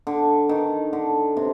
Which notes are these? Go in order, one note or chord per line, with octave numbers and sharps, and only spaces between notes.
D3
D#3
D3
C3